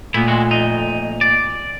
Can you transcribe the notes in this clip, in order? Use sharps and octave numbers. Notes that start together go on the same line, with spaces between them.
A#2 A3 B3 E4
G#3 C4 F#4
F2 D#4
D5